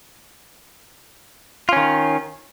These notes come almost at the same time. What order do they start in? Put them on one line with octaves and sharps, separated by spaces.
F4 C#4 D#3